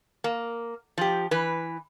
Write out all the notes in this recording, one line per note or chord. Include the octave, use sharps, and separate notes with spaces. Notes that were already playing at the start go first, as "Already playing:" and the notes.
A#3
F3 G4
E3 B4